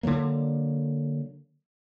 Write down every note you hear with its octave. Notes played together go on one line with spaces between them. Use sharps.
D3 E3 F#3 A#3